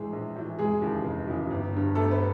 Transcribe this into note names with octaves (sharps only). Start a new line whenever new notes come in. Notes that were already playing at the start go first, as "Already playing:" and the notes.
Already playing: A#1 A2 E3 G#3 G#4
A#1
A2 E3
F1 G#3 G#4
D#2 C#3 E3
F1
D#2 C#3 E3
G1
G2 D3
G1 A3 A4
B3 B4